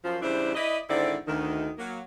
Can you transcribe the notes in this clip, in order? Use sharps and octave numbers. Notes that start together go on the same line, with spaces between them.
F#2 F3
C#3 E3 G3 D4 E4 C5
E4 B4 D5 D#5
G#2 D3 D#3 C4 E4 D5
D2 D#3
F#3 A#3